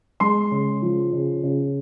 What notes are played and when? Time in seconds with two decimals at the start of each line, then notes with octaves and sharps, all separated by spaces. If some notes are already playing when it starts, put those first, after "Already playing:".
0.20 G#3 C6
0.51 C#3
0.82 F3
1.13 C#3
1.43 C#3